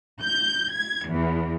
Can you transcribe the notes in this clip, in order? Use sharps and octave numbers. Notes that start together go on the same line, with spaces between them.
G6
G#6
E2